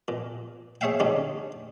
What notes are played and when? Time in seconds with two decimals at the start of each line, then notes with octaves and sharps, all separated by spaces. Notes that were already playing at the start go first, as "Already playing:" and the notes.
0.08 A#2
0.81 G#4 C#5 E5 F5 G5
1.00 D3 G3 C#4 D#4